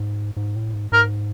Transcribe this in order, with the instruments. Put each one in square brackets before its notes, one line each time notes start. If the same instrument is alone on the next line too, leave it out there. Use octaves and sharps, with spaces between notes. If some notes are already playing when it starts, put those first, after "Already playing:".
Already playing: [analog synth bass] G#2
G#2
A2
G#2
[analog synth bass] G#2 [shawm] A#4